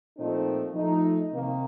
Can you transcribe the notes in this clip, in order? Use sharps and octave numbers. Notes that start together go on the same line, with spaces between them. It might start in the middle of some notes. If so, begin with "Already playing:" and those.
A#2 F3 A3 C4 D#4
F3 A3 D#4
C3 D#3 A#3